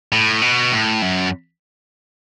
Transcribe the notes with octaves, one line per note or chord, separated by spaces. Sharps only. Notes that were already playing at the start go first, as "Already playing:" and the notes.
A2
B2
A2
F#2